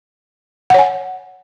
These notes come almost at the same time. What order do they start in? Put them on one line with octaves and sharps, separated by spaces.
F#5 C#5 G#5